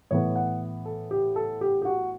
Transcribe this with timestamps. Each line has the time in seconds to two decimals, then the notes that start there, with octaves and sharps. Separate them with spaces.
0.11 A2 E3 B3 C#5
0.36 F#5
0.86 A4
1.11 G4
1.36 A4
1.61 G4
1.82 G4
1.85 F#4